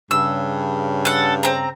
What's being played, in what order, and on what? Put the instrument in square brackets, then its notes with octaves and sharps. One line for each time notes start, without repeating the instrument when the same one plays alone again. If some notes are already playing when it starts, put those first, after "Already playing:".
[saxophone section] G2 C#3 [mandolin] E6
[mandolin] A4 F#5
C4 A#5